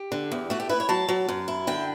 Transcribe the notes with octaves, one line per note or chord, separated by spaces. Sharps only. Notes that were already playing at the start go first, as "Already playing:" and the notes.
Already playing: G4
D3
E2
A3 F#4
G4
E4 B4
C#5
F#3 A5
F#3
F#2
E4
D3 G5